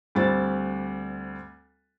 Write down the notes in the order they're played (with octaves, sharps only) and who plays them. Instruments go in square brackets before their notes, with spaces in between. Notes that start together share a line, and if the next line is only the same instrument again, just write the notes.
[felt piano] D2 G3 C4 A6